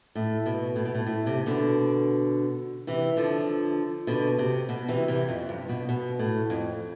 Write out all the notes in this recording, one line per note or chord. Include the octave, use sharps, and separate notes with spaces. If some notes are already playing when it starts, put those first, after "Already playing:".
A2
B2
A2
B2
A2
A2
C3
B2 D3
C3 E3
D3 F3
B2 D3
C3
B2
C3 E3
C3 E3
F2
G2
B2
B2
A2
F2